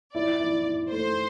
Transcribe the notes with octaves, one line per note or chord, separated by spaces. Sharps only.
E4 D5
E4
E4
A3 C5